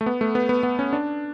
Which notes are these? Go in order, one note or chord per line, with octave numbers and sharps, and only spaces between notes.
A3
B3
A3
B3
B3
B3
C#4
D4